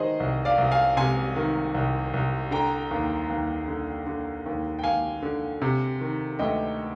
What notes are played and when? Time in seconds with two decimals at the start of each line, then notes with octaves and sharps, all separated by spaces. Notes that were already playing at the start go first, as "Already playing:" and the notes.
Already playing: D#3 G#4 C5 D#5
0.20 C2
0.45 D5 F5
0.58 C2
0.71 F5 G#5
0.97 C3 G#5 C6
1.36 D#3
1.74 C2
2.14 C2
2.51 D3 G5 A#5
2.91 D#2
3.30 D#2
3.68 D3
4.06 D3
4.46 D#2
4.79 G5
4.84 D#2 F5 G#5
5.22 D3
5.62 C3
6.01 D#3
6.39 D2 D#5 G5